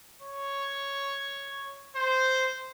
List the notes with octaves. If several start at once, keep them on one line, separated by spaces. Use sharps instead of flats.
C#5
C5